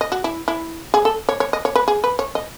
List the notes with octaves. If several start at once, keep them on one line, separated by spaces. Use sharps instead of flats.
D#5
F#4
E4
E4
G#4
A4
C#5
C#5
D#5
C#5
B4
G#4
B4
C#5
D#5